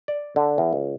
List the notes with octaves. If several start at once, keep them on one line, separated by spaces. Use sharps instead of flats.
D5
D3
E2
C#2